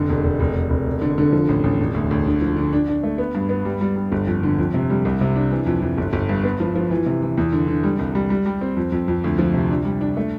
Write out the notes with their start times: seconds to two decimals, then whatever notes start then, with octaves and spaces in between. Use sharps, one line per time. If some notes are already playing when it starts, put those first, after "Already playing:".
Already playing: F1 D3
0.09 E1
0.24 E1
0.40 F1
0.56 F1
0.70 F1
0.87 E1
1.02 D3
1.18 D3
1.32 F3
1.48 A1
1.64 A1
1.79 E1
1.94 D2
2.11 D2
2.26 D3
2.42 F3
2.56 D3
2.73 D4
2.88 D4
3.03 A3
3.18 B3
3.34 G2
3.49 B3
3.65 G3
3.81 G3
3.96 G3
4.12 G1
4.27 F2
4.43 D3
4.58 F2
4.74 C3
4.90 G3
5.05 C2
5.21 C3
5.36 D4
5.51 E3
5.66 F2
5.82 F2
5.98 G1
6.13 G1
6.29 G2
6.44 B3
6.60 F3
6.75 F3
6.91 E3
7.06 C3
7.22 E3
7.37 E2
7.52 D3
7.68 D3
7.83 G3
7.99 C2
8.15 G3
8.30 G3
8.46 G3
8.61 C4
8.77 F2
8.92 F2
9.08 F2
9.24 D2
9.38 F3
9.54 C3
9.70 D4
9.85 G3
10.01 D4
10.17 A3